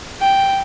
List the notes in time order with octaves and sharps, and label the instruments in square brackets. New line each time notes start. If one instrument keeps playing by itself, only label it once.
[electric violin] G5